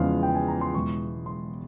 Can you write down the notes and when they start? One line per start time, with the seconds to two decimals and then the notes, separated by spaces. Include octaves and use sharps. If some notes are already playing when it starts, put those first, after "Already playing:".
Already playing: E2 C#3 F3 G#3 F5
0.23 G5
0.35 G#5
0.48 A#5
0.61 C6
0.74 E1 E2 E3 G#3 C#6
1.26 C6